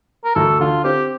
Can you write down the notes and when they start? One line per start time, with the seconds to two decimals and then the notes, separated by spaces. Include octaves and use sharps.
0.25 A#4
0.36 D2 A4
0.60 D3 F4
0.84 C4 G4